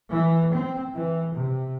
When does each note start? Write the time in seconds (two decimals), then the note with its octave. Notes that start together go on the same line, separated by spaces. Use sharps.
0.11 E3
0.53 C4
0.95 E3
1.34 C3